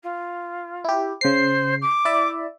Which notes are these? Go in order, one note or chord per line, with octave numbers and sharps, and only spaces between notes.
F4
E4 G4
C#3 C5 C7
D6
E4 D5 E5